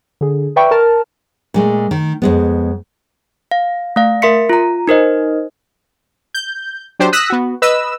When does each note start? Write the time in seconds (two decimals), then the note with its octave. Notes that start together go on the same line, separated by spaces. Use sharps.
0.21 D3 G#4
0.56 B4 D5 E5 G5 B5 C#6
0.71 A#4 A5 F6
1.54 A#2 G#3 A3
1.91 D#3
2.22 F2 G#3 B3
3.51 F5
3.96 A3 F5
4.22 A#4 E5 C6 B6 C#7
4.49 F4 A#5
4.87 D#4 A#4 C5 D#5
6.34 G6
6.99 F#3 D4 G4 C5
7.12 D#6 E6 F#6 A#6 B6
7.30 B3 F#4
7.62 B4 D#5 E6